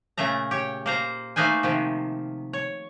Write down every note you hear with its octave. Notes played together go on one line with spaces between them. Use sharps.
A#2 C#3 A3 E5 A#5
G4 C#5
A#3 C5 A#5
A3 A#3 D#4 B4 C5 G#5
C3 D#3 F3
C#5